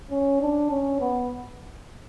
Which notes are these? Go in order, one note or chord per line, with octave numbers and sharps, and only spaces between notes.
C#4
D4
C#4
B3